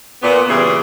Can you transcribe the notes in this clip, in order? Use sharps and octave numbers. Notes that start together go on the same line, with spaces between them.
A#2 B3
A#2 C#3 E3 G3 E4 G#4